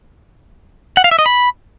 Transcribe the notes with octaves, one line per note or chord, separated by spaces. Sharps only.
F#5
F5
E5
D#5
B5